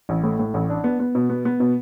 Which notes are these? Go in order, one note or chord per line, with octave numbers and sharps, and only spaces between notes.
A1
A2
A2
A1
D4
B3
B3
B2
B3
B3
B2